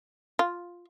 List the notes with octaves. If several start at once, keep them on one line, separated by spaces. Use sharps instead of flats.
F4